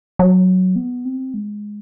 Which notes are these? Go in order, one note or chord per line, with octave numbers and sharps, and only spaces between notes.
F#3
B3
C4
G#3